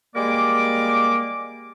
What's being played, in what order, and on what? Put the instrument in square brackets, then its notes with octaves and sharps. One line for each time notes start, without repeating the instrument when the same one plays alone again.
[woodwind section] G3 G#3 A#3 A#4 D5 D6